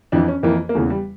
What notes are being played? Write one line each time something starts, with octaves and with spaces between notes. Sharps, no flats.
F2 E3 D4
C#4
F2 E3 A#3
A#3
E2 C#3 E3 A3
G3